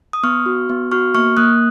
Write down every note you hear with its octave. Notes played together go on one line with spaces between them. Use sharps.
D#6
B3 C#6 F6
F#4
B3
F#4 C#6 F6
A#3 C#6 F6
A#3 D#6 F#6